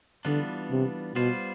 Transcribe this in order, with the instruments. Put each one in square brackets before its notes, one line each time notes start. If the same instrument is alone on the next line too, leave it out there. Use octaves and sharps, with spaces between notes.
[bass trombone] D3 [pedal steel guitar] E3 G3 B3 D4 F4
[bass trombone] C3
[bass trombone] B2 [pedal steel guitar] G3 B3 F4 C5